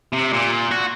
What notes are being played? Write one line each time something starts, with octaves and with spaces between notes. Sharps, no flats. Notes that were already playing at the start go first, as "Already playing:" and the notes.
C3
A#2
F#4